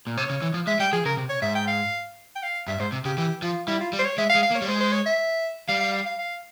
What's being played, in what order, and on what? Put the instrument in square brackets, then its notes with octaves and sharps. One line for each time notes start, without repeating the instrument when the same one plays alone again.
[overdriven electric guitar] A#2
[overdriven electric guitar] C3 [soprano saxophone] C#5
[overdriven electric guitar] C#3
E3
F3
[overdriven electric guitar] G#3 [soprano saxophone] E5
[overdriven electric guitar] G3 [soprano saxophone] G5
[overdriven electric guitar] F3 [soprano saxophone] G#4
[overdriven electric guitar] C#3 [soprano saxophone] A#4
[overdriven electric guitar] C3
[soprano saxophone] C#5
[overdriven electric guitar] G#2 [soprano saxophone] E5
[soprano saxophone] G5
F5
G5
F5
[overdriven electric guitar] G2 [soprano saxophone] E5
[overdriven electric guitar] G#2 [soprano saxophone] C5
[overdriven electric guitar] C3
[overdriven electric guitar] C#3 [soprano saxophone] G4
[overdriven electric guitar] E3 [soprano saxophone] G4
[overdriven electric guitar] F3 [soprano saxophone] F4
[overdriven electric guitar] G3 [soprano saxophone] E4
[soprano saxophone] F4
[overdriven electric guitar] G3
[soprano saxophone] C5
C#5
[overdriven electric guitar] G#3 [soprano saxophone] E5
[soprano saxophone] F5
[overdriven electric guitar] G#3
[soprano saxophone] F5
[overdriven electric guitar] A#3
[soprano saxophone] C#5
[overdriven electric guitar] G3
[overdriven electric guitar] G#3 [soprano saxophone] C5
[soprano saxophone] C5
C#5
E5
[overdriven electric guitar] G3 [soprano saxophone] F5
[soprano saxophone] F5
F5
F5
F5